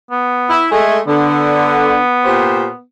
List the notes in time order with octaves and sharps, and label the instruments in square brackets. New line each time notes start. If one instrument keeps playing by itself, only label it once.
[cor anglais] B3
[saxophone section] E4
[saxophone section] G#3 A3 [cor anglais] G#5
[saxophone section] D3 [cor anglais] B3
[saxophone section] A#2 G4 C5